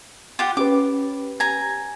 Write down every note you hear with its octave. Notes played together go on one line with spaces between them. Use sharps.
F4 G4 F#5
C#4 G4 B4 D6
G#5 A#5